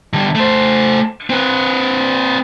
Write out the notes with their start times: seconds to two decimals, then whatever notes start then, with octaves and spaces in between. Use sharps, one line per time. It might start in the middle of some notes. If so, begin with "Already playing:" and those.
0.13 D3 G3
0.35 A3 C5
1.30 C4 B4